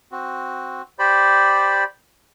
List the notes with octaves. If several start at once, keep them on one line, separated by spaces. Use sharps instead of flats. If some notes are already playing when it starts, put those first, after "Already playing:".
C4 F#4
G4 C5 D5 B5